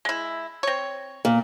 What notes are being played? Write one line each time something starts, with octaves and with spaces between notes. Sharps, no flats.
G#3 E4
C4 C#5
A#2